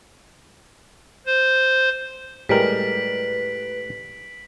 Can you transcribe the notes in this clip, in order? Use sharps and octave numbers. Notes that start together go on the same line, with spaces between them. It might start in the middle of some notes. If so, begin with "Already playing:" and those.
C5
A2 G3 G#3 A#4 B4 B6 D7 F#7